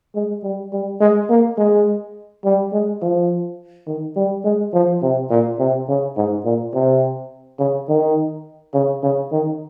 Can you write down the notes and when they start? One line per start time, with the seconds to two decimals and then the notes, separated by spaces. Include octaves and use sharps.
0.15 G#3
0.43 G3
0.73 G3
1.01 G#3
1.30 A#3
1.58 G#3
2.45 G3
2.73 G#3
3.02 F3
3.87 D#3
4.16 G3
4.44 G#3
4.73 F3
5.02 C3
5.30 A#2
5.59 C3
5.88 C#3
6.16 G#2
6.45 A#2
6.74 C3
7.59 C#3
7.88 D#3
8.74 C#3
9.03 C#3
9.32 D#3